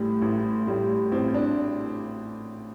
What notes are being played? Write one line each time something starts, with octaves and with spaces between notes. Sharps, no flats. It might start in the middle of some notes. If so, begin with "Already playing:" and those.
Already playing: A1 A2 G3
A1
A2 G3
A1 C4
D4